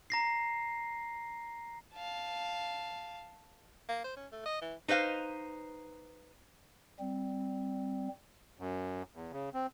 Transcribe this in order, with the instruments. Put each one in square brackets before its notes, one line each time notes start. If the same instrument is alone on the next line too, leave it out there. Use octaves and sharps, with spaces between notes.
[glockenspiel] A#5 A#6 C7
[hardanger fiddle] F5 A5
[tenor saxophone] A#3
C5
C#4
A3
D#5
E3
[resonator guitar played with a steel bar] D#4 B4 C5 F5
[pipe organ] G3 C4
[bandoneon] F#2
E2
C#3
C4